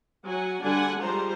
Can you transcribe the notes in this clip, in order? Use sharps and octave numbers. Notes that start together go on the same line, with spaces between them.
F#3 F#5 G#5
D3 G3 D4 F#5 G#5
F3 G3 G#3 C5 A#5